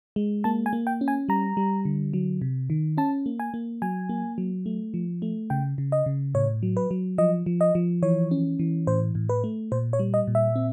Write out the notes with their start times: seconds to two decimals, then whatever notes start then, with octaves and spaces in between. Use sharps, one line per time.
0.16 G#3
0.44 A#3 A5
0.66 G#5
0.73 A#3
0.87 G5
1.01 C#4
1.08 G#5
1.29 G3 A#5
1.57 G3
1.85 D3
2.13 F#3
2.42 C3
2.70 D#3
2.98 C#4 A5
3.26 A#3
3.40 G#5
3.54 A#3
3.82 F#3 G#5
4.09 A#3
4.38 F#3
4.66 A3
4.94 F3
5.22 A3
5.50 C#3 G5
5.78 C#3
5.92 D#5
6.06 C#3
6.35 A2 C#5
6.63 F#3
6.77 B4
6.91 F#3
7.18 F3 D#5
7.46 F3
7.61 D#5
7.75 F3
8.02 E3 C#5
8.31 C#4
8.59 E3
8.87 A2 C5
9.15 A2
9.29 B4
9.44 A3
9.72 A#2 C5
9.93 C#5
9.99 G3
10.14 D#5
10.27 A#2
10.35 E5
10.56 C4